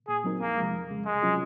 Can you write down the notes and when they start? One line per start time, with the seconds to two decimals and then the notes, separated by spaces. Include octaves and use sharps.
0.08 A#2 G#4
0.24 F#3 C4 D#4 A#4
0.41 F2 A#3
0.57 C3 F3 G#3
0.74 F2
0.90 C#3 G#3
1.06 C2 G#3
1.23 C3 F#3 C#4 F4